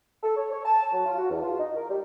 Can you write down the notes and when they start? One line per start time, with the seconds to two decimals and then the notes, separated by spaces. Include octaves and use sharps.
0.23 A4
0.36 C#5
0.51 C#5
0.65 A5
0.92 F#3
1.06 F4
1.18 F#4
1.30 E2
1.43 F4
1.59 D#4
1.75 A#4
1.90 G3